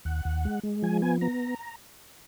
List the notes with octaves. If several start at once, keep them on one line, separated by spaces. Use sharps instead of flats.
D#2 F#5
D#2
G#3
G#3
F3 G#5
B3 G#5
B3 A#5